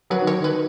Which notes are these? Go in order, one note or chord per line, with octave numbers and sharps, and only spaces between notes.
F#3 B4
D#3
C#5
D#3 B4